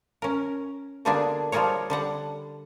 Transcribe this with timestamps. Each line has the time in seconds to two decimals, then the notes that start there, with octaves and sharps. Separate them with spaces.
0.22 C#4 A#4
1.05 B2 D3 G3 A#3 D4 G#4
1.52 F3 G3 F4 G#4 A#4 C#5
1.90 D3 G3 F#5